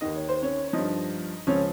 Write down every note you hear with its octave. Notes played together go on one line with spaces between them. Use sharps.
D#2 D#3 D#5
C#5
C5
C#4 C#5
C#5
G2 F3 D#4 D#5
C#2 C#3 F3 C#4 C#5